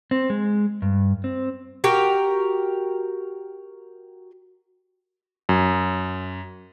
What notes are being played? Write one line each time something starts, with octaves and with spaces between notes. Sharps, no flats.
C4
G#3
G2
C4
F#4 G4 A#4 G5
F#2